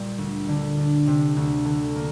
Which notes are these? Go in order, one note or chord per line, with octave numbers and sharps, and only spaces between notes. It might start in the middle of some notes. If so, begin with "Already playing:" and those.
Already playing: A#2 G3
D2
D3
D4
C3
D2
D3
A#3